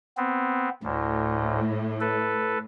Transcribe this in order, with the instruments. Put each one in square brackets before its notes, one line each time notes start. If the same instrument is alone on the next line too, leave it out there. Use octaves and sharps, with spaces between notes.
[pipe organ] B3 C4
[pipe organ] D2 [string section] A2
[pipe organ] A4 B4